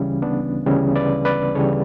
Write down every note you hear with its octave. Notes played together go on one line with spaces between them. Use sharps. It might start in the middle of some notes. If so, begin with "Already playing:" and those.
Already playing: D2 C#3 E3 G3 C#4
B3 D4
D2 C#3 E3 G3 C#4 E4
B4 D5
B4 D5
D2 C#3 E3 G3 A4 C#5